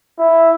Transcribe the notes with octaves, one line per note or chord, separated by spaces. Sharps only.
E4